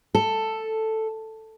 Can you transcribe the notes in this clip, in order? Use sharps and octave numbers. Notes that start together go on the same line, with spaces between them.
A4